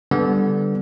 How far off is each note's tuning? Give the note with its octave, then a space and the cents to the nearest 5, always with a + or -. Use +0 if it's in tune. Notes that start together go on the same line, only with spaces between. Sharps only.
D3 +0 G3 +0 B3 +0